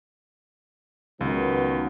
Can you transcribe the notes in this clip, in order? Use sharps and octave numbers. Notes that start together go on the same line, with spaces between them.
C#2 D#3 F#3 B3